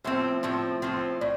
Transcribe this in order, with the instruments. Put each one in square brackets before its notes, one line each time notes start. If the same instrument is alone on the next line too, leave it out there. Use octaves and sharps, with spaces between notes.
[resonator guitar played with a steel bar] A2 F3 C4 [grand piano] E5
[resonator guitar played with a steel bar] A2 F3 C4
A2 F3 C4
[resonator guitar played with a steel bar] A2 [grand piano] D5